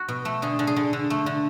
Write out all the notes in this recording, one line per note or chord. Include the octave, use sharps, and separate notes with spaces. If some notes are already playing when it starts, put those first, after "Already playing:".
Already playing: F#4
B2
A3
D3 G#4
D3
G#4
D3
D3
A3
D3